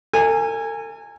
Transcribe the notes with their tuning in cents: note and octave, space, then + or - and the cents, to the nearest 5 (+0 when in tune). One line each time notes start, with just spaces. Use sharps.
A4 +45 G#5 -15